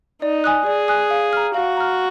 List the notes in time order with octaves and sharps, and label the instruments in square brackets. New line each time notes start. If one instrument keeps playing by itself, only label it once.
[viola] D#4 [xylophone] D5
[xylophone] G#5 D#6 F#6
[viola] G#4 [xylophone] D5
[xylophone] G#5 D#6 F#6
F5
A#5 F6
[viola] F#4 [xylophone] F5
[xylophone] A#5 F6